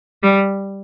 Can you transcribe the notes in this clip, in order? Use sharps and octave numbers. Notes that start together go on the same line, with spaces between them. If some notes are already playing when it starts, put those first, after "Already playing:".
G3